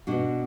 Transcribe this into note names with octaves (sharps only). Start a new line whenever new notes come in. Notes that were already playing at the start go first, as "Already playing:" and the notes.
B2 B3 D4 F#4